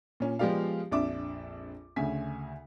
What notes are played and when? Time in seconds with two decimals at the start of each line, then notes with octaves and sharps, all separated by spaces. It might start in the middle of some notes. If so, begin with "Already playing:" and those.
0.20 A#2 C#4
0.39 F3 G#3 B3 G4 D5 F5
0.91 A#1 F2 D4 E5 D6
1.96 D2 C#3 G#5 B6